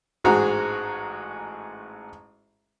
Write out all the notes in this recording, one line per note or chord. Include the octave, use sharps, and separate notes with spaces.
A1 G#2 G#3 F#4 G#4 A#5